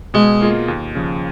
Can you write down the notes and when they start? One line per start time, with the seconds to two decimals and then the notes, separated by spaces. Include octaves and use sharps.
0.14 B2 G#3
0.41 A#3 F4 G#4 D#5
0.68 D#2
0.95 C#3 F3